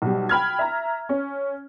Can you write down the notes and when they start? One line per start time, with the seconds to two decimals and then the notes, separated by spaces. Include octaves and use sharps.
0.02 B1 G3
0.29 G5 B5 F6 G#6
0.59 E5 A#5
1.09 C#4